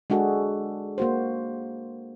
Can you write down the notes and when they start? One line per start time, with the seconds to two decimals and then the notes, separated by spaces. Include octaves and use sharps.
0.10 G#3 D4 F#4 G#4 A4
0.98 A#3 F#4 C5